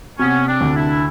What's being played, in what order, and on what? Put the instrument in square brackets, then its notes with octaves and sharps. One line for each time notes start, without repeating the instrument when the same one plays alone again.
[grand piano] C3 [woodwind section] B3 C#4
[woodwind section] C4 D4
[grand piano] D2
[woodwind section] D4 E4